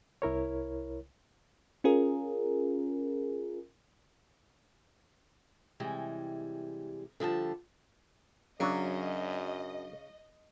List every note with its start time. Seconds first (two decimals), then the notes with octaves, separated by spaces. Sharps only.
0.22 C2 E4 A#4 C#5
1.84 C#4 F4 G#4 A#4
5.80 C3 E3 G3 G#3
7.20 D3 F3 G3 A5
8.60 F#2 C#3 F#3 D4 D#5